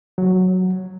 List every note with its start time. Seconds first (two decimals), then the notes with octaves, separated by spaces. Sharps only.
0.18 F#3